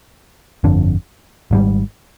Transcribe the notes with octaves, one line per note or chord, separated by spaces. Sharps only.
G1 F2 D3
G#1 G#2 G3